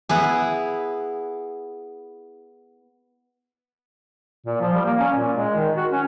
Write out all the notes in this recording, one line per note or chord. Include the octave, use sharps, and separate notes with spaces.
B3 E4 G#4
A#2
F3
G3
A#3
C#4
A#2
G#3
D#3
F#4
C#4